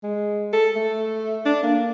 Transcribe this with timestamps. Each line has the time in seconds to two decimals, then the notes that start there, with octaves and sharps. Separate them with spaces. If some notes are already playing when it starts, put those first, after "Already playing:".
0.03 G#3
0.53 A4
0.76 A3
1.46 D4
1.63 A#3